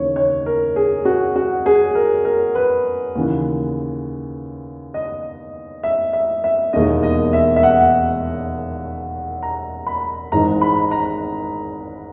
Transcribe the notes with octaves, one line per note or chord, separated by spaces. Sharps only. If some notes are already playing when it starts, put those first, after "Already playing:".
Already playing: D#2 C#3 E3 C#5
C#5
A#4
G#4
F#4
F#4
G#4
A#4
A#4
B4
D#2 C#3 E3
D#5
E5
E5
E5
E1 D#2 D#3 D#5
D#5
E5
E5
F#5
A#5
B5
G#1 G#2 E3 A#5
B5
A#5